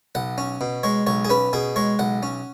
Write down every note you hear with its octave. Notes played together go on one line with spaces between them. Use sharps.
B1 F#5
C#4
B2
G#3 C#5
B1 C#5
G#4
C#4 B4
B2 G#4
G#3 C#5
B1 F#5
C#4